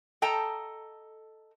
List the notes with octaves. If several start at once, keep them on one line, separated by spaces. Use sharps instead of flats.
A4 D#5 G5 A5 A#5